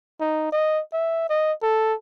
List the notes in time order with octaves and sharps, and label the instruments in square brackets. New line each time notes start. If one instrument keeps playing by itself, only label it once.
[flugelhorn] D#4
D#5
E5
D#5
A4